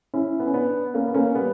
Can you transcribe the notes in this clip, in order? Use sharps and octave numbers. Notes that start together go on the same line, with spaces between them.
C#4 E4
B3
C#4
B3 D4
A#3 C#4
B3
A#3 C#4
G3 B3